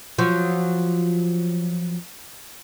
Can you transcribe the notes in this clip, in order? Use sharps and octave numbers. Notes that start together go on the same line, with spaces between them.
F3 F#3